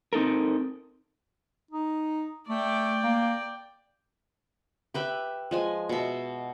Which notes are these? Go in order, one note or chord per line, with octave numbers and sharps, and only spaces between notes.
C4 D#4 A4 A#4
D#4
A3 D5 G5
A#3
G4 B4 E5 G5
F3 G#3 G#5
B2 E5